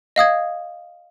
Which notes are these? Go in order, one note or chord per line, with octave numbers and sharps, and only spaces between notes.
D#5 F5 D#6 G#6